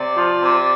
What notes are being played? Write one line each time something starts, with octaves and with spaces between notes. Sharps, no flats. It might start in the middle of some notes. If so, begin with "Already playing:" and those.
Already playing: C3 D5
F3
C3